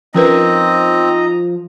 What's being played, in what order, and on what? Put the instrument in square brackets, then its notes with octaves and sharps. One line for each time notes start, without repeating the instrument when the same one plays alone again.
[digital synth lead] F3 [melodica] C4 [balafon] C#4 A#4 B4 [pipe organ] D#4 D#5 A#5